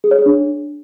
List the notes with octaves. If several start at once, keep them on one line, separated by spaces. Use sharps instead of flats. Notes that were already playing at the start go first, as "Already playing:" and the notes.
G#4
C#5
G#4
D4